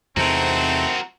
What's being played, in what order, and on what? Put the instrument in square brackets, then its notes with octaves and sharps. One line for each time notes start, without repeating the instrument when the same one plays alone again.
[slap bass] E2 C3 [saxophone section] A3 D#4 C5 [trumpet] C4 [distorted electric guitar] F#4 A#4